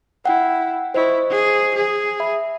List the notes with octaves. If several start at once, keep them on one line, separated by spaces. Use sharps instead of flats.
E4 F#5 G5
E4 C5 D#5 C#6
G#4
G#4
E5 B5